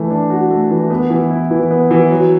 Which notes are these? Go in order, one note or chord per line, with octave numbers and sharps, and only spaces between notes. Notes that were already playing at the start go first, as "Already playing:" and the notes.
Already playing: E3 A3
D4
F#4
A3
E3
B3
E3
E4
E3
B3
E3
F#3